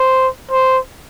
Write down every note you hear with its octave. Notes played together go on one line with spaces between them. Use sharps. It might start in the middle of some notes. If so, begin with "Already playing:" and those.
Already playing: C5
C5